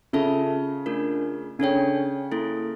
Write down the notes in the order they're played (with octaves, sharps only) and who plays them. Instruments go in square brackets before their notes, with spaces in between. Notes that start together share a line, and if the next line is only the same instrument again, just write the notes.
[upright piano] C#3 [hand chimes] F4 A4 E5 A5
[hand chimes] A3 D4 F4 A#4
[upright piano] C#3 [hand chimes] D4 A4 C#5 G5
[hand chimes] A#3 E4 A4